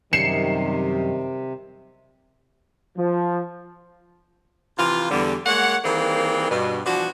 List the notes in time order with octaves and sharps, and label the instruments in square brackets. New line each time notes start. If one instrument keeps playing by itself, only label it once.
[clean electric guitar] F#2 C#4 [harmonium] C3 [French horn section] D#3 G3 [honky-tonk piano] C7 C#7 E7
[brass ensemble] F3
[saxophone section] C3 E3 F3 F4
E2 D3 G3
G#3 A#3 C#5 F#5
D#3 E3 G3 A#3 C4 G#4
G2 B2
E3 F3 B3 D4 F#4